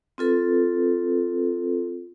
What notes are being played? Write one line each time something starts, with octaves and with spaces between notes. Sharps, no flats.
C4 F4 A4 B4